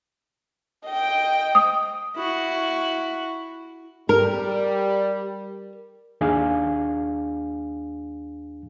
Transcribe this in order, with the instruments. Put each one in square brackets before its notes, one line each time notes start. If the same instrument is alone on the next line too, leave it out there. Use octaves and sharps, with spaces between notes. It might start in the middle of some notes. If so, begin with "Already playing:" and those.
[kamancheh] D#5 G5
[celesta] D#6
[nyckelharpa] E4 F#4
[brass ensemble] G3 [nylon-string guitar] A#4
[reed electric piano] D#2 D4 G#4 F5 G#5